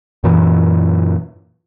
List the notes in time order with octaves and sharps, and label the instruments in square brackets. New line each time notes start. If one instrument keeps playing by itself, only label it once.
[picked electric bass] F#2 A#2 E3